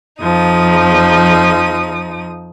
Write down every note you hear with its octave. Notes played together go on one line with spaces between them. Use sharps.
F2 F3 D#4 D#6